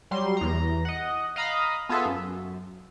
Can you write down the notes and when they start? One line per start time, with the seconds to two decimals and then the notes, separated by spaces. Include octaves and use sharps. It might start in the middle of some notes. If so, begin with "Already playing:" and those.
0.11 F#3 G3 C6
0.37 E2 A#5
0.85 D#5 F#5
1.36 D#5 F5 A#5 B5 D#6
1.89 B3 F4 G#4 A4 E5
2.05 F#2